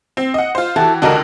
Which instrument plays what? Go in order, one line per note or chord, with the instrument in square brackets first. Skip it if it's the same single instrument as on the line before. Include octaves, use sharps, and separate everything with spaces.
[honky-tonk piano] C4
D#5 F#5
F4 C5
[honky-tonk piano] E3 F#4 G4 [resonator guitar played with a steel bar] E4 A4
[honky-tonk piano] C#2 D3 A#4 [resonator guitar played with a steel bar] D4 F#4 D#5